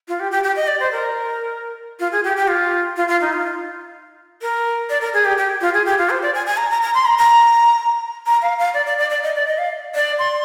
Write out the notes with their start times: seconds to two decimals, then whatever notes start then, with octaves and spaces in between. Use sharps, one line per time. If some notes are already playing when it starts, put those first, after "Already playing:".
0.08 F4
0.20 G4
0.31 G4
0.43 G4
0.56 D#5
0.67 D5
0.80 C5
0.92 A#4
1.99 F4
2.12 G#4
2.24 G4
2.37 G4
2.48 F4
2.96 F4
3.08 F4
3.21 D#4
3.33 F4
4.41 A#4
4.89 D5
5.01 A#4
5.13 G#4
5.25 G4
5.37 G4
5.61 F4
5.74 G#4
5.86 G4
5.98 F4
6.10 C5
6.22 D5
6.34 G#5
6.46 G#5
6.57 A#5
6.70 A#5
6.82 A#5
6.94 C6
7.05 A#5
7.18 A#5
8.26 A#5
8.42 F5
8.59 F5
8.74 D5
8.86 D5
8.98 D5
9.10 D5
9.23 D#5
9.35 D5
9.47 D#5
9.58 F5
9.95 D5
10.19 C6